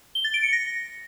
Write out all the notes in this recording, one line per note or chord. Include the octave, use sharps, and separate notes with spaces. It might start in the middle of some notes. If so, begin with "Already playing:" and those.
G7
A6
D7
C#7
A#6